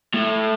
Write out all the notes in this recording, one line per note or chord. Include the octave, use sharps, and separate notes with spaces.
A2